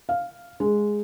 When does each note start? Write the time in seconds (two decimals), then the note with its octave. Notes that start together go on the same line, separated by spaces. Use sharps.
0.09 F5
0.60 G#3